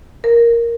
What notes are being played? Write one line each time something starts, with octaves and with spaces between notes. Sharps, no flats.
A#4